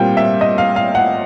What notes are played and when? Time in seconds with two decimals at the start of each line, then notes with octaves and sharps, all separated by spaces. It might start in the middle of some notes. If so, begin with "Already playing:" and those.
Already playing: A#2 G3 C4 G5
0.17 E5
0.41 D#5
0.58 F5
0.76 F5
0.95 F#5